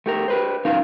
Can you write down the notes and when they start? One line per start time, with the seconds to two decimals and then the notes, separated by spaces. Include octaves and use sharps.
0.06 A3 G4 A#4
0.28 G4 B4 C5
0.65 F#3 C#4 D#4 F4 A#4 F5